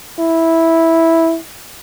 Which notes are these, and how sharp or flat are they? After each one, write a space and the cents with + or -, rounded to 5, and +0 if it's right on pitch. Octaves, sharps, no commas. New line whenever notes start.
E4 -5